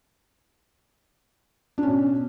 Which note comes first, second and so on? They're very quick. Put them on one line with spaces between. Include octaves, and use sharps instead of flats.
D4 C#4 B2